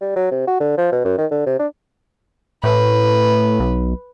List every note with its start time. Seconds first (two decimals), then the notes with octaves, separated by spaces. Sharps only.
0.01 G3
0.16 F#3
0.31 C3
0.47 F#4
0.60 D3
0.77 F3
0.92 B2
1.05 F#2
1.18 D#3
1.31 D3
1.46 C3
1.59 D4
2.64 A2 B4
3.60 B1